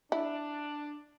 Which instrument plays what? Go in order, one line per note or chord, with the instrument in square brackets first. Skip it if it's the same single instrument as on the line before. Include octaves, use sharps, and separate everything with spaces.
[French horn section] D4 [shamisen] E4